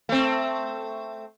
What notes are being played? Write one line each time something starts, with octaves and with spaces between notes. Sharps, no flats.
A3 C4